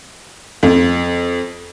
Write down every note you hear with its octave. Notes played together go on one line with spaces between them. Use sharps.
F2